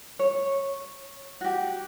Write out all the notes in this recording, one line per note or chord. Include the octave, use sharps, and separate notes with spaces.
C#5
F#4 G4